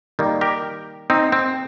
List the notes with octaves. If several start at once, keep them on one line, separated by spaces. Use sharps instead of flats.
D#3 G3 A#3
G4 A#4
C4 D#4
C4